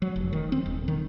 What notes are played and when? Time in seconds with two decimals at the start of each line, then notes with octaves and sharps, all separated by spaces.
0.02 F#3
0.16 F1
0.33 D#3
0.52 C4
0.66 D#1
0.88 D#3